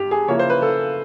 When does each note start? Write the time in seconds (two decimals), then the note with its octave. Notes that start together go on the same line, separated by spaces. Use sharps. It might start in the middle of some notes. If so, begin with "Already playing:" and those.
Already playing: G2 G4
0.11 G#4
0.28 C#3 F3 A#3 C#4 E4 C#5
0.39 C5
0.50 B4
0.62 A4